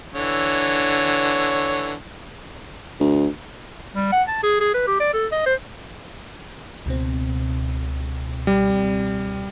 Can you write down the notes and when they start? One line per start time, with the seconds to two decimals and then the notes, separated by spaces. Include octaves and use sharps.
0.15 D3 E3 C#5
3.01 D2
3.95 G3
4.12 F#5
4.28 A5
4.43 G#4
4.61 G#4
4.74 B4
4.87 G4
5.00 D5
5.14 A4
5.32 D#5
5.46 C5
6.86 C#2 B2 C4
8.47 G3